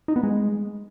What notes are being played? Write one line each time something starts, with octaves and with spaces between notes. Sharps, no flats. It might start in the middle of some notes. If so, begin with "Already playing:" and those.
D#4
B3
G#3